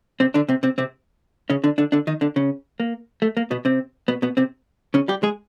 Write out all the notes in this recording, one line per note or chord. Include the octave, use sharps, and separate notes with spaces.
C3 C4
D3 D4
C3 C4
C3 C4
C3 C4
C#3 C#4
D3 D4
D3 D4
D3 D4
D#3 D#4
D3 D4
C#3 C#4
A#3
A3
A#3
B2 B3
C3 C4
B2 B3
B2 B3
C3 C4
C#3 C#4
G3 G4
G#3 G#4